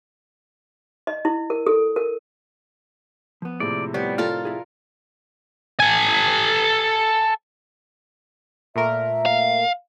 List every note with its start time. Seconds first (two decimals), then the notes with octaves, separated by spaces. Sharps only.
1.07 D#5
1.25 E4
1.50 A#4
1.67 A4
1.96 A#4
3.42 F3 B3
3.60 A2 C3 F3 A#3 G#4 D5
3.94 G3 B3 C5 C#5
4.18 F4 A4 A#4 F6
4.45 E4 G#4
5.80 A4 G#5
8.76 A#2 A3 A#4 E5
9.26 F5